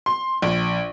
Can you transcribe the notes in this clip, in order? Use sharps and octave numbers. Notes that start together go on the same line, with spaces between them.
C6
A#1